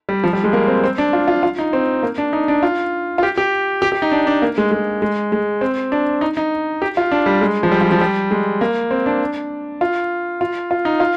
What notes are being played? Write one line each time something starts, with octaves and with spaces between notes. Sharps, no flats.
G3
F3
G3
G#3
A#3
C4
C4
D4
F4
F4
F4
D#4
C4
A#3
D4
D#4
D4
F4
F4
G4
G4
G4
G4
D#4
D4
D4
A#3
G#3
G#3
G#3
G#3
C4
D4
D#4
D#4
G4
F4
D4
G3
G#3
F3
G3
F3
F3
G3
G#3
A#3
C4
D4
F4
F4
F4
D#4
F4